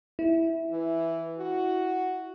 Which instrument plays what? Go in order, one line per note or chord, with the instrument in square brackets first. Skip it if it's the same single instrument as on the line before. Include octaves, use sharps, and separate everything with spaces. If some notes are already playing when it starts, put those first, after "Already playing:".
[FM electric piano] E4
[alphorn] E3
F#4